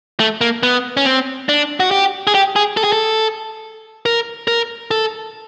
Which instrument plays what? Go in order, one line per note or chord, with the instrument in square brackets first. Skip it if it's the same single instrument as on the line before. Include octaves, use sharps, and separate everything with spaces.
[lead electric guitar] A3
A#3
B3
C#4
C4
D4
F#4
G4
G#4
G4
G#4
A4
G#4
A4
A#4
A#4
A4